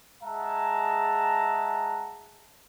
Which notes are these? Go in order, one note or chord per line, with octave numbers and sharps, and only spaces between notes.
G#3 G#4 E5 F#5 A5 A#5